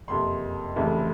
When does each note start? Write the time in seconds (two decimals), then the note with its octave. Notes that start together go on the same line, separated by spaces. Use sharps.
0.08 F#1 F2 C3 C6
0.76 F1 F2 C#3 E3 G3